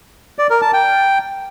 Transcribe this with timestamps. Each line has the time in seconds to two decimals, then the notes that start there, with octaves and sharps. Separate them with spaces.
0.39 D5
0.50 A#4
0.62 A5
0.73 G5